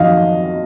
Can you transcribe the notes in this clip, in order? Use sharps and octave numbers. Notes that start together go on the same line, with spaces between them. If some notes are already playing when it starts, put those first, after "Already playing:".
Already playing: F2 D#3 F#3 D#5 F5